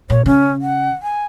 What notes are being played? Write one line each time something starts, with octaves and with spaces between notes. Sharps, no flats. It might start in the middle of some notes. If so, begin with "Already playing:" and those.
A#2 C#5
C#3 C#4
F#5
G#5